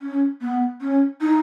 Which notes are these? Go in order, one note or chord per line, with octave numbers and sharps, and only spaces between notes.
C#4
B3
C#4
D#4